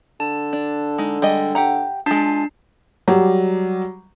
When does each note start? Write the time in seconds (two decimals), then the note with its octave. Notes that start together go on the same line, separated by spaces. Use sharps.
0.20 D3 A5
0.53 D4
0.98 G#3 D#4
1.22 G3 G#3 D#5
1.55 G4 F#5 A#5
2.06 G#3 D4 F4 A5 C7
3.08 F#3 G3 G4